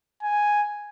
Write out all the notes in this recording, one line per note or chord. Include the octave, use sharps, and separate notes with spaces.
G#5